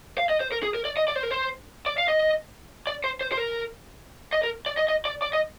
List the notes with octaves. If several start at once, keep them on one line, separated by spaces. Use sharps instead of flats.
F5
D#5
C5
A#4
G#4
A#4
D5
D#5
D5
C5
A#4
C5
D5
F5
D#5
D5
C5
C5
C5
A#4
D#5
A#4
D5
D#5
D#5
D5
D5
D#5